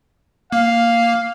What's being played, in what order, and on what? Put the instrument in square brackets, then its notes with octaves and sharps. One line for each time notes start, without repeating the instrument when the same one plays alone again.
[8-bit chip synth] A#3 [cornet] F5